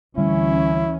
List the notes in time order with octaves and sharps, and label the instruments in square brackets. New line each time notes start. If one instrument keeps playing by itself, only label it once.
[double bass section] D2 E3 C#4 [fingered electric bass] D3 G3 A3 [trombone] E4